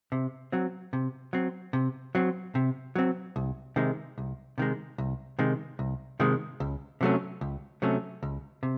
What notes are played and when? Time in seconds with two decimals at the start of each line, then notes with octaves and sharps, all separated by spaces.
0.12 C3
0.52 F#3 C4
0.93 C3
1.33 F#3 C4
1.73 C3
2.15 F#3 C4
2.55 C3
2.95 F#3 C4
3.36 C2
3.76 C3 D#3 G#3
4.18 C2
4.58 C3 D#3 G#3
4.98 C2
5.39 C3 D#3 G#3
5.79 C2
6.20 C3 D#3 G#3
6.60 C#2
7.01 C3 F#3 A3 C#4
7.41 C#2
7.82 C3 F#3 A3 C#4
8.23 C#2
8.63 C3